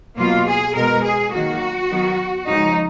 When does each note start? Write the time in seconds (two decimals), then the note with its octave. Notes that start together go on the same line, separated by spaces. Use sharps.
0.17 B2 F#3 A#3 F4
0.47 G#4
0.75 B2 G#3 B3 A#4
1.03 G#4
1.32 D#3 F#3 A#3 F#4
1.90 D#3 F#3 B3
2.47 C#3 F3 G#3 D#4